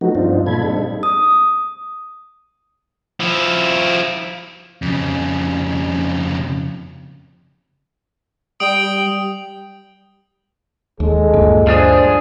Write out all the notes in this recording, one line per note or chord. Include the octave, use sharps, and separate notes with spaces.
F3 F#3 A3 B3 D#4 F#4
G2 F3 C4 D4 D#4 F4
A#2 F4 A4 B5 G#6
G3 G#3 C4 D4 D#4 A4
D#6
F3 E4
F2 C#3
G3 G5 D#6 D7 F#7
D#2 G#3 A4
D2 G2 A#2
F3 D4 G#4 C5